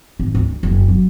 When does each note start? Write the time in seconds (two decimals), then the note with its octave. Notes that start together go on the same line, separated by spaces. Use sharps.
0.19 G#1
0.35 D2
0.63 F#1
0.88 F#3